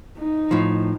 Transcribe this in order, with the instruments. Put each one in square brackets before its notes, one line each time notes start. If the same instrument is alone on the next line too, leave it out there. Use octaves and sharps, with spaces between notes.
[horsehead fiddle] D#4
[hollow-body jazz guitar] A2 F3